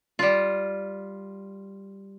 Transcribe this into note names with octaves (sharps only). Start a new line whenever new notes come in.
G3 F4